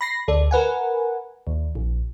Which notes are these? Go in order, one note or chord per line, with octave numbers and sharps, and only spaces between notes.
B5 A#6 C7
D2 A4 D5
A#4 B4 F#5 G#5
D#2
A#1